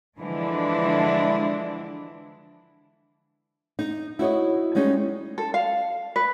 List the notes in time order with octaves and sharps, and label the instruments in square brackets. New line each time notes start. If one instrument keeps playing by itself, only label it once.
[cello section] D3 E3 F3 G#3 D4 E4
[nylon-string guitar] D#4
E4 F#4 C#5 D#5
G3 G#3 C#4 D#4
[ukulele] A4
F5
B4